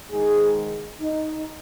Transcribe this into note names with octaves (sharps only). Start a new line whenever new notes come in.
G#2 D#3 G#4
D#4